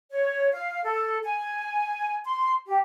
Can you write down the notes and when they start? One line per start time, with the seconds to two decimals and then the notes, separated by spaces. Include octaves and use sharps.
0.11 C#5
0.51 F5
0.84 A4
1.23 G#5
2.24 C6
2.66 G4